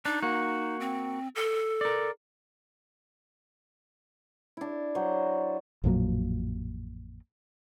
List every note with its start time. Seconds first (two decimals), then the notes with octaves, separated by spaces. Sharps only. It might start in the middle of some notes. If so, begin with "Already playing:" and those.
0.05 D4 D#4
0.22 A#3 F#4
0.80 C4
1.35 A4
1.81 A#4 D5
4.57 D4 E4
4.95 F#3 C5
5.84 A1 F2 A#2 F#3